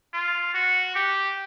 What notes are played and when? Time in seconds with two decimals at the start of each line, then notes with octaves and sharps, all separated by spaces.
0.13 F4
0.54 F#4
0.95 G4